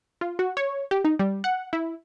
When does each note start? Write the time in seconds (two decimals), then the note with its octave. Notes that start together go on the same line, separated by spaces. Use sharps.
0.21 F4
0.39 F#4
0.57 C#5
0.91 G4
1.05 D#4
1.19 G3
1.44 F#5
1.73 E4